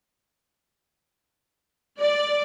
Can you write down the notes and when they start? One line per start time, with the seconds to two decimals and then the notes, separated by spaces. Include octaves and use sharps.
1.98 D5